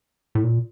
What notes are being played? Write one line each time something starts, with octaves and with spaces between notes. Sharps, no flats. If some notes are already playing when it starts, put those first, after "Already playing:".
A2
A#2